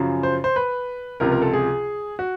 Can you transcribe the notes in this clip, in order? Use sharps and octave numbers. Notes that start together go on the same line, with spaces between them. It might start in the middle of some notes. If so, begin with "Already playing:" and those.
Already playing: F#2 C#3 F3
C5
C5
B4
C#2 C3 F3 A#4
A#4
A4
G#4
F#4